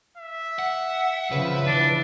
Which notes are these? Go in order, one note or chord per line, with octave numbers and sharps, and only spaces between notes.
E5
F#5
C#3 F3 B4
E3 D4